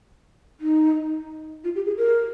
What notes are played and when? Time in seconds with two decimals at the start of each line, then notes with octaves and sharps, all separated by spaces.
0.60 D#4
1.64 F4
1.76 G4
1.86 G#4
1.98 A#4